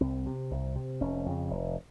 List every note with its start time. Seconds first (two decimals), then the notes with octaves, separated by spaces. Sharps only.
0.01 C2 C4
0.26 C3
0.51 C2
0.76 C3
1.01 F1 C#4
1.26 F2 C#3
1.51 F1